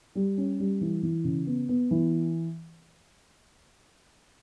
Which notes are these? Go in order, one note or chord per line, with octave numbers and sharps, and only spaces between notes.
G3
C#4
G3
E3
E3
C#3
B3
B3
E3